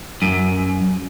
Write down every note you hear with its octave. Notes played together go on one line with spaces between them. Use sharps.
F#2